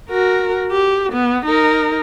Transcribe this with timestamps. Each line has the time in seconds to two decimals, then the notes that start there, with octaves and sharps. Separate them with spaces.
0.10 F#4 A#4
0.72 G4
1.12 B3
1.45 D#4 A#4